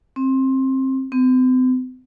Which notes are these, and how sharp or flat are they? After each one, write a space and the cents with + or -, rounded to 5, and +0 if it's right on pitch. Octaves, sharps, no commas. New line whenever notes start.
C4 +20
C4 -45